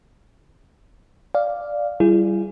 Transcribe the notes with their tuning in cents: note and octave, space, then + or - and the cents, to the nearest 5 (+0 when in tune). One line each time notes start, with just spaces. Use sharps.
D5 +0 F5 +0
G3 -15 E4 +40 G#4 +0